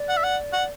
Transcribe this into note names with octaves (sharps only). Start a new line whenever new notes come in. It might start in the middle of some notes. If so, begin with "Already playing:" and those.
Already playing: D5
F#5
E5
F#5
F#5